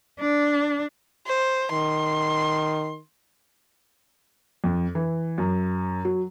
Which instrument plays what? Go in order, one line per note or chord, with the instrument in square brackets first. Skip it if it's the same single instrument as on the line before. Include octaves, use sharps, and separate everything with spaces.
[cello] D4
[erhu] C5
[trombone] D#3 [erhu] C6
[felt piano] F2
E3
F#2
F#3